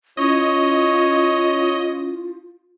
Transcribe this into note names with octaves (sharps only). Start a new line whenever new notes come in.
C#4 E4 F4 C#5 D#5